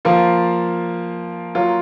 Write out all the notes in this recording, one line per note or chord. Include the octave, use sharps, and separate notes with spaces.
F3 A#3 F4
F#3 A#3 F4